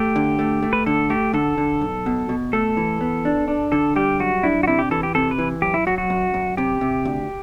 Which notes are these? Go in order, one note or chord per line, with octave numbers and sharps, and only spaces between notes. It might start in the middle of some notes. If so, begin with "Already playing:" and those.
Already playing: A3 G4
D3
A3
A3
B4
D3 A4
A3 G4
D3 A4
D3
B1
B2
B2
A3 A4
E3
B3
D4
D4
D3 A4
G3 G4
F#2 F#4
D4 E4
F#4
C3 E4
G4
E3 A4
G4
C3 A4
B4
E3
F#2 G4
E4
F#3 F#4
F#4
F#2
F#2
C3 G4
C3
D2